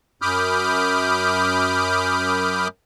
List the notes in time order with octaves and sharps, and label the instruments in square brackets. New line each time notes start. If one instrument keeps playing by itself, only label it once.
[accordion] F#2 B5 D6 D#6 F6 G6